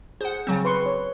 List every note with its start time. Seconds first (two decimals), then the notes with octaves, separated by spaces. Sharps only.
0.21 G#4 C5 F#5
0.47 C#3 F#3 C4
0.65 B4 C6 C#6
0.86 C#5